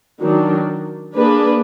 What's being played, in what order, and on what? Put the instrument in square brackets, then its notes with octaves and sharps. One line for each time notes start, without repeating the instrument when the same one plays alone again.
[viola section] D#3 F#3 D4
A#3 D4 G#4 B4